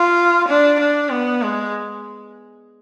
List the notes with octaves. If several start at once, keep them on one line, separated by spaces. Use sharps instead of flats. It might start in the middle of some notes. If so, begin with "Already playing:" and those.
Already playing: F4
D4
D4
B3
G#3